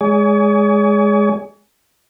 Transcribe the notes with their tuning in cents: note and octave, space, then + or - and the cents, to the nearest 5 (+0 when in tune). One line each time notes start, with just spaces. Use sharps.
G#3 +0 G#4 +0 C#5 +40